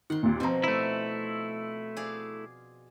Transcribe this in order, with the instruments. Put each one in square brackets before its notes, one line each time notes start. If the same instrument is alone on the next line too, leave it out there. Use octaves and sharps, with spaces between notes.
[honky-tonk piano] D#3 [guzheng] F#5 C6
[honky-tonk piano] D#2 A#2
[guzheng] B2 F3 [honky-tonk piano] C4 A#5
[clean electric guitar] A3 E4
[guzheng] G#4 D5 F5